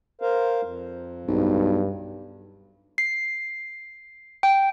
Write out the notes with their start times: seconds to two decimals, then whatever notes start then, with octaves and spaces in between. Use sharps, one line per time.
0.21 A#4 C5 F5
0.62 F2
1.27 B1 G2
2.98 C7
4.43 G5